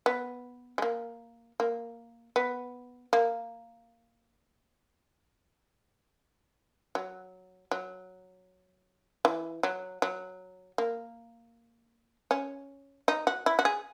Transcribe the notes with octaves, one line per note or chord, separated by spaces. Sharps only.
B3
G#3
A#3
A#3
B3
A#3
F#3
F#3
E3
F#3
F#3
A#3
C#4
D#4
F#4
E4
F#4
G#4